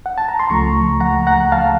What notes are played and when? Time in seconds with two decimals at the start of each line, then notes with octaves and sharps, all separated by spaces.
0.06 F#5
0.18 A5
0.29 A#5
0.39 C6
0.50 C#2 C#3 F3 A3 A#5 C#6
1.00 F#5 A#5
1.27 F#5 A#5
1.52 F5 A5